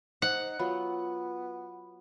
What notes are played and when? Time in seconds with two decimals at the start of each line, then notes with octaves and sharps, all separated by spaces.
0.22 D#4 C5 D#5 F#5
0.59 F#3 B3 F4 B5